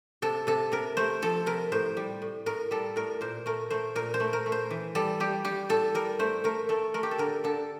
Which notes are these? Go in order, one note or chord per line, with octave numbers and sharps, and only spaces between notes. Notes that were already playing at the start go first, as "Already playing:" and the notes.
C3 A4
C3 A4
C3 A#4
A3 C5
F3 A4
C3 A#4
A2 C5
G3
A2
A2 A#4
G3 A4
A2 A#4
A#2 C5
A3 A#4
A3 C5
A#2 A#4
C5
A3
A#4
A3
C5
E3
G3 A4
G3 G4
G3 G4
A2 A4
G3 A#4
A3 C5
A3 A#4
A3 A4
A3 A#4
G4
A4
D3 A#4
D3 A4